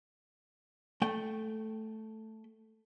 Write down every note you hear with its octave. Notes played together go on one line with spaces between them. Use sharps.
A3 G5